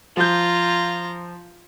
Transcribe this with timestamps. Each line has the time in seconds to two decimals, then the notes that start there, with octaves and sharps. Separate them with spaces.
0.17 F3 F4 A#5 G6